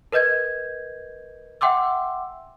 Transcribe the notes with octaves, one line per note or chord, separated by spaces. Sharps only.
A#4 B4 D#5 G6 G#6
E5 F#5 G5 C6 D6 E6